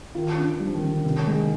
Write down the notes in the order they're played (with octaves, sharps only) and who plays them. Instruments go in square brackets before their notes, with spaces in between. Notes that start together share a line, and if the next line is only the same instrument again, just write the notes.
[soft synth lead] D#3 [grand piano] F4
[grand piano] D4
[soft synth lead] F3 [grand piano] G3
[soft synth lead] D#3
[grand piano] D3
C3
G#3